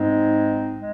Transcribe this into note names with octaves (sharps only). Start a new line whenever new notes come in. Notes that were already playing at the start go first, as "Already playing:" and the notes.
Already playing: G#2 G#3 C4 D#4
G#3